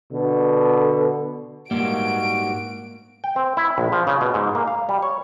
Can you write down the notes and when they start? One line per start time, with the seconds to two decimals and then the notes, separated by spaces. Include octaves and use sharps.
0.13 B2 D3
1.71 G#2 G3 A#3 F#4 D7
3.24 G5
3.36 C4
3.57 E4
3.78 A#1
3.92 F3
4.07 C#3
4.21 B2
4.34 G#2
4.55 A#3
4.68 F5
4.89 G3
5.02 C#5